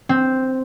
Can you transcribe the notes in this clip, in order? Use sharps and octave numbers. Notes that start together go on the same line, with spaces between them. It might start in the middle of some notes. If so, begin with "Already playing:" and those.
C4